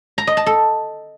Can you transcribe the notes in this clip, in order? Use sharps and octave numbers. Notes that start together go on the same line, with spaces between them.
A#5
D#5
A5
A4